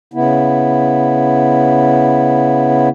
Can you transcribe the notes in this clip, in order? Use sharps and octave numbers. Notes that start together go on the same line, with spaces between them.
C#3 B3 E4